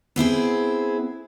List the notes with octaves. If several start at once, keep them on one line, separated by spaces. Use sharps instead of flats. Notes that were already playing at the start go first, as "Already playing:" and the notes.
B3 C4 E4 G#4